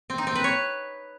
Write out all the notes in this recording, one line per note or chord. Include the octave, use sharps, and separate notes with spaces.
C4
D#4
C4
B4
C#5